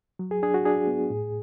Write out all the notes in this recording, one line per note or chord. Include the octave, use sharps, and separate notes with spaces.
F#3
G#4
D4 G#4
F#4
D4 G#4
B3
A2